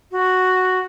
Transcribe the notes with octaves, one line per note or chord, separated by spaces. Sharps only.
F#4